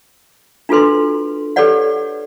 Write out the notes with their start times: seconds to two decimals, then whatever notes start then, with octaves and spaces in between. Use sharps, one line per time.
0.69 D4 F4 F#4 A4 B4 C6
1.56 G4 A4 B4 C#5 D5 F#5